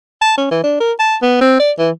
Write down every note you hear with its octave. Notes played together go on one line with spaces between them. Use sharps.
A5
C#4
E3
D4
A#4
A5
B3
C4
D5
E3